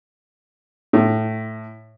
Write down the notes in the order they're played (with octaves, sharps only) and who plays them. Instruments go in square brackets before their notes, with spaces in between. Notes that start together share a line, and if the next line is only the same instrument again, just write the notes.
[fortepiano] A2